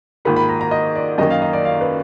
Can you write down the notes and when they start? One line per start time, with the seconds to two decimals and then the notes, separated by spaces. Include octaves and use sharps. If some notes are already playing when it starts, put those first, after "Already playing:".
0.25 G#2 D#3 A#3 F4 B5
0.36 B5
0.49 A#5
0.61 A#5
0.71 D#5
0.96 D5
1.18 F#2 D#3 A#3 D#5
1.30 F5
1.42 D#5
1.53 D5
1.65 F5
1.81 B4